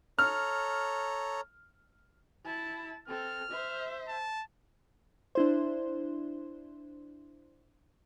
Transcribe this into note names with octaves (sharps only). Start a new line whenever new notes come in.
A4 C#5 A#5 F6
E4 A5
C4 A4 F6
C5 E5
A5
D4 E4 C5